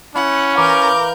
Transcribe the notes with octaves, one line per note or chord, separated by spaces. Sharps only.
C#4 E4 F#5
E3 A#4 F5 A#5 D6 G6